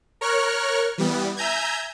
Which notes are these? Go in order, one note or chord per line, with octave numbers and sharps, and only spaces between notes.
A#4 C#5 C#6 F6 F#6
E3 G3 B3
E5 G#5 A#5 G6 G#6